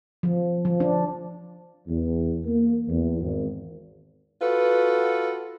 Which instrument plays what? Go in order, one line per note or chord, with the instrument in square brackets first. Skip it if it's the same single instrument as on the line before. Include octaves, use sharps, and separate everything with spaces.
[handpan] F3
F3
D4
[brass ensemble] E2
A#3
E2
G#1
[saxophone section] F4 F#4 A4 B4